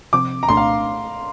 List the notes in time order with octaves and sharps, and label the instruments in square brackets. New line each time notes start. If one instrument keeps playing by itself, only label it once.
[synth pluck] C3 F3 C4 [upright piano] D6
[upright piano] A#5
[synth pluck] C2 A#2 A3 D4 [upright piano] C6
[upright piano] F5